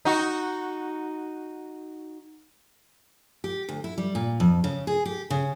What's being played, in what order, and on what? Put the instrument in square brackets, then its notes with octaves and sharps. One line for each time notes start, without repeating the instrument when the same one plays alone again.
[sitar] D#4 F#4
[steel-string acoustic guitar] G4
D2
E4
G3
A#2
F2
C#3
G#4
G4
C#3